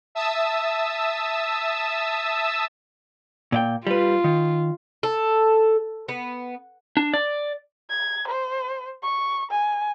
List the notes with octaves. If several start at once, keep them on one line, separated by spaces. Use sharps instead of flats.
E5 A5 D#6 E6
A#2 D5 G5
G3 F4 B4
D#3
A4
B3
D4
D5
G#6
C5
C#6
G#5